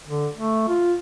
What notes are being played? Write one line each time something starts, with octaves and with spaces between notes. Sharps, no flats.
D3
A3
F4